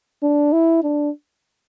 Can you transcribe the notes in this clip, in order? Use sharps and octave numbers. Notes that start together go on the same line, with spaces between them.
D4
E4
D4